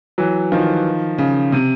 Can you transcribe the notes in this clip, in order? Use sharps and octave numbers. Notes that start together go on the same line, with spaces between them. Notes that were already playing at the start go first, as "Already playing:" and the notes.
E3 F#3
D#3 F3
C#3
C3